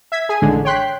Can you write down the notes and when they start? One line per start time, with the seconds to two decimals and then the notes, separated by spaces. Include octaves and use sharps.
0.12 E5 G#6 B6
0.29 G#4 G#5
0.42 A1 D3 G#3
0.65 C#5 G5 C6 F#6 B6